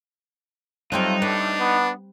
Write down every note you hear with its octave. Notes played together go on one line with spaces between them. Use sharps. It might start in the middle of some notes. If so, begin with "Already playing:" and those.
F#3 G3 A3 C4 D#4 F4
A2 D4 B4
B3